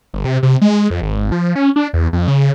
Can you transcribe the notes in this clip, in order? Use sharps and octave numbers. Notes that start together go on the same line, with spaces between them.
G1
C3
C3
G#3
F2
G#1
F3
C#4
D4
E2
F2
C#3